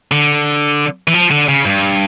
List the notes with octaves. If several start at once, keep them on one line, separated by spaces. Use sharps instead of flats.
D3
E3
F3
D3
C#3
G2